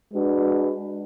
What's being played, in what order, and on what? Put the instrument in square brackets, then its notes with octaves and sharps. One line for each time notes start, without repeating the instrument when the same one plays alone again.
[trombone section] G#3 D4 F#4 B4